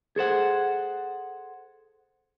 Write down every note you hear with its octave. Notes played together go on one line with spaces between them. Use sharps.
G#4 A4 C5 F#5